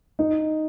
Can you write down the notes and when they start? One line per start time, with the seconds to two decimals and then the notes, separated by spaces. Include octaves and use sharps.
0.19 D#4